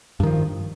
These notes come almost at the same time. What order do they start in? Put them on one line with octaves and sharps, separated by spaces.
G2 D#3 F3